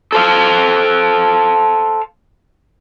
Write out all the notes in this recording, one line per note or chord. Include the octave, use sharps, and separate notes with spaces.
A4 C5 F5